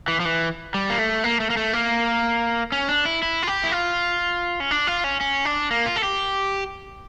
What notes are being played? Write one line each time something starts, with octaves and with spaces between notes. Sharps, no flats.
E3
F3
E3
G3
A#3
A3
A#3
A3
A#3
A3
A#3
C#4
D4
E4
E4
F4
G4
E4
F4
C#4
D4
F4
C#4
C#4
D4
A#3
F4
A4
G4